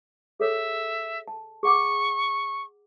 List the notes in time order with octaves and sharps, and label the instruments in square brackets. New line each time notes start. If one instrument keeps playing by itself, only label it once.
[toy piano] G#4 A4 C#5 [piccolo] E5
[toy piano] A5
[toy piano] G#4 F#5 D6 [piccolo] C#6